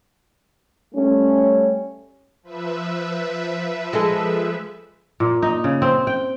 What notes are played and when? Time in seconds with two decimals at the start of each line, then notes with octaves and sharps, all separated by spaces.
0.94 G3 A3 C#4
2.43 F3 B4 E5
3.93 G#3 G#4 A4
5.20 A#2
5.42 D#4
5.64 C#3
5.82 C4
6.07 G5